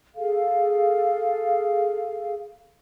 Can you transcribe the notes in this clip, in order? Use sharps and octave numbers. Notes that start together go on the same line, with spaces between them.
G#4 A4 F5